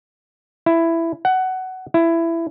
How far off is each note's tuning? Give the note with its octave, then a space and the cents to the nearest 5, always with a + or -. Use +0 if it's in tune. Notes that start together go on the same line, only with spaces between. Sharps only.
E4 +10
F#5 +15
E4 +15